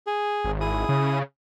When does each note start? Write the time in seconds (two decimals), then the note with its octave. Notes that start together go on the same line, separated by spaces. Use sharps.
0.07 G#4
0.44 G#1
0.61 E4 G#4 D#6
0.89 C#3